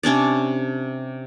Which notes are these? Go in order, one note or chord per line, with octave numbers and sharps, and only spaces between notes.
C3 C#4 D4 D5